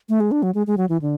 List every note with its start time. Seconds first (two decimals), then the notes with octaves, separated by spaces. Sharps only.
0.09 A3
0.20 G#3
0.32 D4
0.43 F#3
0.55 G#3
0.67 G#3
0.77 F#3
0.89 E3
1.02 D3